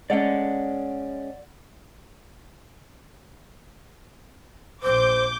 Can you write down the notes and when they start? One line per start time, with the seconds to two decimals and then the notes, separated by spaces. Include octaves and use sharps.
0.10 G#3 C#4 D5 F#5
4.83 A#1 C5 D6 G6